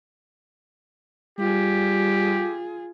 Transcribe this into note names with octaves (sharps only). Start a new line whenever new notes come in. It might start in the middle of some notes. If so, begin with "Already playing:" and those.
G3 F4 G4 G#4